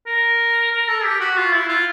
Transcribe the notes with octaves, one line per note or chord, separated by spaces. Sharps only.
A#4
A#4
A4
G4
F#4
F4
E4
F4